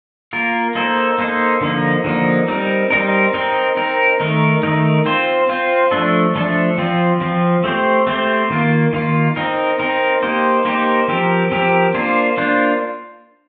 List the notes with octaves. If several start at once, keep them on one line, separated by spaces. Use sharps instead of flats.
A#3 F4 A#4
A#3 D#4 A4 C5
A#3 D#4 A4 C5
D3 F3 A#3 D#4
D3 F3 A#3 D#4
G3 C4 D#4 A#4
G3 C4 D#4 A#4
C4 D#4 A#4
C4 D#4 A#4
D#3 A3 D#4 A#4
D#3 A3 D#4 A#4
C4 F4 C5
C4 F4 C5
F3 A3 D4 A4
F3 A3 D4 A4
F3 C4 F4
F3 C4 F4
A3 C4 G4 C5
A3 C4 G4 C5
D#3 A#3 F4
D#3 A#3 F4
C4 D#4 A#4
C4 D#4 A#4
A#3 D#4 G4 C5
A#3 D#4 G4 C5
F3 C4 G4 A#4
F3 C4 G4 A#4
A#3 D4 F4 C5
A#3 D4 F4 C5